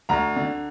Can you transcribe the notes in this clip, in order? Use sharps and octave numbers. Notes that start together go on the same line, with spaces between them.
D2 A#5
D3